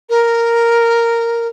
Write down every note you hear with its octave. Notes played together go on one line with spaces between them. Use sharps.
A#4